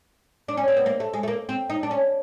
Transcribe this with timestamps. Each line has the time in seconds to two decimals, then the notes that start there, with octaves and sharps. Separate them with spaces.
0.48 D4
0.57 C#4
0.68 C4
0.77 B3
0.86 A#3
1.00 A3
1.13 G#3
1.23 A3
1.28 A#3
1.49 C4
1.70 D#4
1.83 D4
1.91 C#4